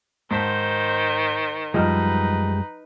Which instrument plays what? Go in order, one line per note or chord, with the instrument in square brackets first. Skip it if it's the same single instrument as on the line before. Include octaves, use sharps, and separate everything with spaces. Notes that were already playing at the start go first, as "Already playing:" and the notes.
[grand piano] G#2 A5 B6 [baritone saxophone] D#3 [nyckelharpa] C5
[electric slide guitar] F#2 G3 G#3 [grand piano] F3 D#5 F6 [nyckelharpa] D#4 B4